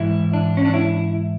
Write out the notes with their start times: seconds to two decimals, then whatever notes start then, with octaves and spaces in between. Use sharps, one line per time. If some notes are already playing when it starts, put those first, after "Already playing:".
Already playing: G#2 E3 E4
0.33 D4
0.57 C#4
0.65 D4
0.74 E4